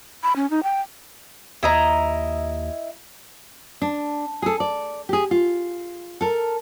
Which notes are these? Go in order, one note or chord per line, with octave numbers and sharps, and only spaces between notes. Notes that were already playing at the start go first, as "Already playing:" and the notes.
B5
C#4
D#4
G5
D#2 E4 D#5 A#5
D4
G#4 A4
D5
G4 G#4
F4
A4 A#4